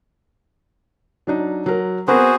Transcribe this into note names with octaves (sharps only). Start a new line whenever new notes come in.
F#3 D4 D#4
F#3 A#4
B3 C4 F#4 G#4 A#4 C5